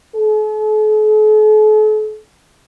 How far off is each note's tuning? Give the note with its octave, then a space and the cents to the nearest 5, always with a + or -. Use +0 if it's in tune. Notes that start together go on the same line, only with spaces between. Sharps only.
A4 -45